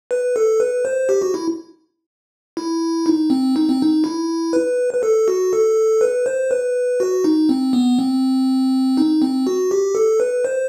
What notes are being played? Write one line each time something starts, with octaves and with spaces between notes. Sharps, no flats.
B4
A4
B4
C5
G4
F#4
E4
E4
D#4
C4
D#4
C4
D#4
E4
B4
B4
A4
F#4
A4
B4
C5
B4
F#4
D#4
C4
B3
C4
D#4
C4
F#4
G4
A4
B4
C5